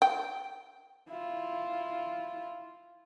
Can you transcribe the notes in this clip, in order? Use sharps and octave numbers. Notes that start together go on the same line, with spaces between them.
G5
E4 F4